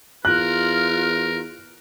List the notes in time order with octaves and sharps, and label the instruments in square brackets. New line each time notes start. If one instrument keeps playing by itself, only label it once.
[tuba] E2 [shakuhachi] F4 [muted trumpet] A#4 [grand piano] F#6